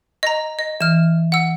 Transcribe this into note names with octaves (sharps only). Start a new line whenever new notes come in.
D#5 A#5
D#5
E3 F6 E7
F#5 E6